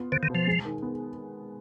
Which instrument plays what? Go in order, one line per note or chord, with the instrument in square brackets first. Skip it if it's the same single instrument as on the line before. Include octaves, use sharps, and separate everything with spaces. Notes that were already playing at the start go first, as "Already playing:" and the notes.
Already playing: [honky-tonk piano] B3 F4
[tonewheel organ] D3 [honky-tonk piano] C5
[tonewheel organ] D#3
[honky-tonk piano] B2
[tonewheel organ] F3
[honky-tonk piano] G#3
D#3
B3